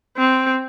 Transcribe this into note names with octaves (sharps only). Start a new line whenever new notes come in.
C4